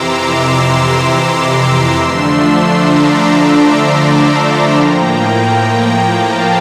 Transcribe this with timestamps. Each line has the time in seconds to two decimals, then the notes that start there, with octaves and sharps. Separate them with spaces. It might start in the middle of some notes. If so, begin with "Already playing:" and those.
Already playing: F2 C3 E3 A#5 C6 D6 E6
0.22 C6 E6
0.57 C6 E6
1.97 D3 F3 A3 D4 C6 E6
2.67 A#5 D6
4.76 A2 F3 A#3 G5 A#5
6.16 F5 A5